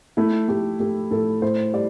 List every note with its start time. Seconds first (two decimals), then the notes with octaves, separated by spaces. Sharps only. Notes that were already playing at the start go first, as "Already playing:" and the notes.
0.17 A3 E4
0.48 A3 G4
0.79 A3 G4
1.11 A2 A4
1.42 A2 C5
1.73 G3 D5